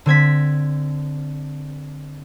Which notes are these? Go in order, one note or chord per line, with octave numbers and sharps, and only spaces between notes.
D3 C4 G#6 B6